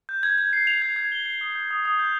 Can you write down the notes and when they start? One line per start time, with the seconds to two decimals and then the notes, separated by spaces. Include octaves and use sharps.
0.09 G6
0.23 G#6
0.38 G#6
0.53 C7
0.67 F7
0.82 G#6
0.96 G#6
1.12 G7
1.26 C7
1.41 D#6
1.56 G6
1.71 D#6
1.85 D#6
1.99 G6